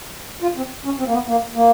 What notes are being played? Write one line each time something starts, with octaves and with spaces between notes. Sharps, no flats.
F4
C4
C#4
C4
A#3
B3
A#3
A#3